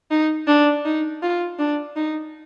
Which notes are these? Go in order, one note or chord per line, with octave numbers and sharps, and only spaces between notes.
D#4
D4
D#4
F4
D4
D#4